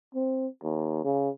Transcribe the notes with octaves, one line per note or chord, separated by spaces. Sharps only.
C4
D#2
C#3